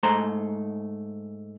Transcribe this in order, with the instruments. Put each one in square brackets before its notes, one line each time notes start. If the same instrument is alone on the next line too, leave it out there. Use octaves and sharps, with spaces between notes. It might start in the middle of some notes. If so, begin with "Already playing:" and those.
[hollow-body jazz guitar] G#2 A3 C5 A#5